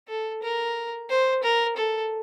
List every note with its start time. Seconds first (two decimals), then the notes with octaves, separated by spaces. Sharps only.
0.08 A4
0.42 A#4
1.09 C5
1.43 A#4
1.77 A4